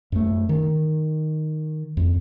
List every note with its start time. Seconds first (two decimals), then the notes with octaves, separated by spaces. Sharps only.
0.12 F#2 A3
0.49 D#3
1.97 F2